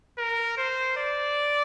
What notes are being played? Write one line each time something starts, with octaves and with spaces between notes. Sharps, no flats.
A#4
C5
D5